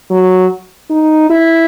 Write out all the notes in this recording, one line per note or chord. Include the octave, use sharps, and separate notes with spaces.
F#3
D#4
E4